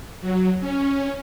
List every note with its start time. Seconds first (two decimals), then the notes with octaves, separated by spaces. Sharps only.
0.21 F#3
0.61 C#4